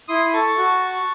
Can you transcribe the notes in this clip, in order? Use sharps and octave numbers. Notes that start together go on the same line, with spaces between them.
E4 C6 D#6
A4 A5 C#6
F#4